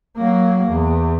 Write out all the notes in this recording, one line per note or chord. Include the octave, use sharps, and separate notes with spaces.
F#3 A#3
E2